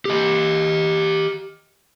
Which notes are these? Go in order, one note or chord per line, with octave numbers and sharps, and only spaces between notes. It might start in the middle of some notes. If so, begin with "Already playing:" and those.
G4 D#5